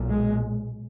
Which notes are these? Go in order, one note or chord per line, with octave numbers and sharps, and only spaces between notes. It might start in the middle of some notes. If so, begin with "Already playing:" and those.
Already playing: B1 A#2
G#3